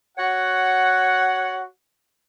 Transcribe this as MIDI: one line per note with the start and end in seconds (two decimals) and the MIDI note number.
0.17 1.61 66
0.17 1.61 73
0.17 1.61 78